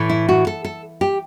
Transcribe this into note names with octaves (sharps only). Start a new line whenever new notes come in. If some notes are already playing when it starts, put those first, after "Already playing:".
Already playing: A2 E3 A3
E4
F#4
A4
A4
G4